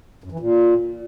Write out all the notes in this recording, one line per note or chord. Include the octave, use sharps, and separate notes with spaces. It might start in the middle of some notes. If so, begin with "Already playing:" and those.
F#2
E3
A#2